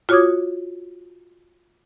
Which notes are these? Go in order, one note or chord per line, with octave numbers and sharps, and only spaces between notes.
F4 F#4 C#5 D6 D#6 G#6